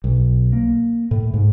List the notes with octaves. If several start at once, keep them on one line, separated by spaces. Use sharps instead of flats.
B1
A#3
A2
G#2